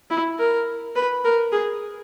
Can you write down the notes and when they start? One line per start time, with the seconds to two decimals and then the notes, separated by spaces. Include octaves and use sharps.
0.10 E4
0.39 A#4
0.95 B4
1.25 A#4
1.52 G#4